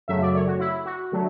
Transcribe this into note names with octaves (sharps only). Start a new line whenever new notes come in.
F#2 C#3 F#3 A3 E5
D5
C#5
F#4
E4
F#4
D3 F#3 A3